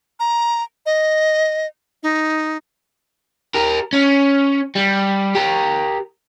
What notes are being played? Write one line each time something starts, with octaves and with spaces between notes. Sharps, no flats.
A#5
D#5
D#4
G4 A#4
C#4
G3
G4 A#4